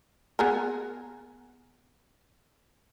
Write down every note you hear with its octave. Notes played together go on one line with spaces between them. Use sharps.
B3 G#4 A#4